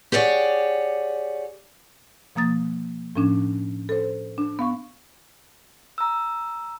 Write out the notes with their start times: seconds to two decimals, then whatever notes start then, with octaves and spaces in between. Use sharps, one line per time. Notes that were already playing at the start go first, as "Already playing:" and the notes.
0.12 G4 G#4 C#5 D5 F#5
2.35 B2 F3 A#3 D#6 A6
3.16 A2 F3 C#4 D4
3.89 A4 C5
4.38 D4
4.59 B3 F5 C#6
5.98 A#5 E6